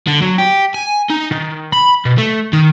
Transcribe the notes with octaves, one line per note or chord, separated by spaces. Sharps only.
D3
F#3
G4
G#5
D#4
D#3
B5
B2
A3
D#3